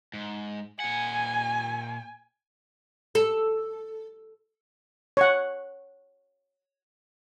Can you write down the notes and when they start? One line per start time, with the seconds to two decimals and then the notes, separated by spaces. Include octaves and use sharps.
0.14 G#2
0.80 A#2 F#5 G#5
3.15 A4
5.17 C#5 F#5